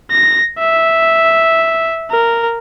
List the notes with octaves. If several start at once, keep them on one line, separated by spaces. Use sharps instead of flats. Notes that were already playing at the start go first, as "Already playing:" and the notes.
A#6
E5
A#4